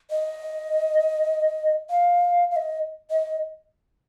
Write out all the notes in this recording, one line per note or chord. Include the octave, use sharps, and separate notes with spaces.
D#5
F5
F5
D#5
D#5